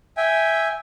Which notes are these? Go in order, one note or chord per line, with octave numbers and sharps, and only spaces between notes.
E5 G5 G#5